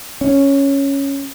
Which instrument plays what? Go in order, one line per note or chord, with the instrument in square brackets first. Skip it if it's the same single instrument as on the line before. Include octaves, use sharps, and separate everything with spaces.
[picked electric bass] C#4